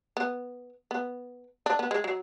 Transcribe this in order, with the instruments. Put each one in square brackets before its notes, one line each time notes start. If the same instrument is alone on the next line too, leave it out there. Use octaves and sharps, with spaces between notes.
[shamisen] B3
B3
D4
B3
G#3
F#3